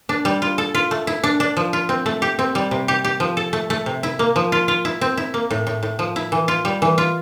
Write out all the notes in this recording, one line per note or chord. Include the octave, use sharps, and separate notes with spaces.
D4
G3
F4
A4
F4
A3
E4
D4
D4
F3
F4
C4
A3
G4
C4
G3
C3
G4
G4
F3
A4
A3
A3
C3
E4
A#3
F3
F4
F4
E4
C4
E4
A#3
A2
A2
A2
F3
E4
E3
F4
G3
E3
F4